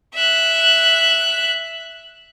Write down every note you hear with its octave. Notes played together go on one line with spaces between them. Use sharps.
E5 F#6